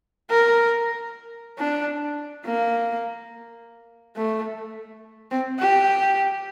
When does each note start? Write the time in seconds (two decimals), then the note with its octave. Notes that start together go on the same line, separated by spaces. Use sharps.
0.30 A#4
1.59 D4
2.45 A#3
4.16 A3
5.31 C4
5.59 G4